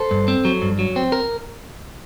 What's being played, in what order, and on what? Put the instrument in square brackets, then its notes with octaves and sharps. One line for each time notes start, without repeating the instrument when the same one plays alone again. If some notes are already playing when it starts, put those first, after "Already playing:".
Already playing: [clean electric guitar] A4 C5
G2
C4
F#3
G2
F#3
C4
A#4